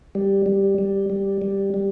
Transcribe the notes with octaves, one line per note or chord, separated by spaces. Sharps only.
G3
G3
G3
G3
G3
G3